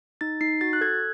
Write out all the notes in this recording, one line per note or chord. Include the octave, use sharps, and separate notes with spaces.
D#4 A6
D#4 C7
F#4 A6
F#6
A4 G#6